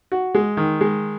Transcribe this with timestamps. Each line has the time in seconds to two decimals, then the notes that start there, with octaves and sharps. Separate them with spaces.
0.12 F#4
0.35 G#3
0.57 D#3
0.81 G#3